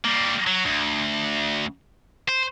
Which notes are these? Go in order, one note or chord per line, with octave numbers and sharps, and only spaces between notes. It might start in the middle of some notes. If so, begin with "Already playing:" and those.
G3 A#3
F#3
D2
C5